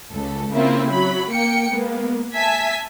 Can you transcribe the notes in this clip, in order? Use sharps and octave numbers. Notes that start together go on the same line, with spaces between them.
C#2 A4
C#3 A#3 C4 E4 F4
F#3 B5
A#3 G5 C#7
G#3 A#3 B3
E5 G#5 A5 G#6 B6